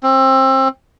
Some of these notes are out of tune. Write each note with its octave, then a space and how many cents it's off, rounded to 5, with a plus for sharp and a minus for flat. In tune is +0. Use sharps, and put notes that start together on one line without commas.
C4 +25